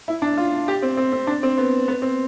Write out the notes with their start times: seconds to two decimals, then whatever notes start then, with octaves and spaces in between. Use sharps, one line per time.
0.08 E4
0.22 D4
0.37 F4
0.68 G4
0.82 C4
0.97 C4
1.12 C4
1.27 D4
1.43 C4
1.58 B3
1.88 B3
2.02 C4